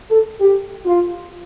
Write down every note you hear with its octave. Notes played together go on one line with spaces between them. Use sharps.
A4
G4
F4